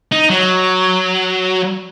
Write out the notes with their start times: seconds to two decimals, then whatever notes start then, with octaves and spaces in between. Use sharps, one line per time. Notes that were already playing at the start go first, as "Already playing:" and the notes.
0.12 D#4
0.30 F#3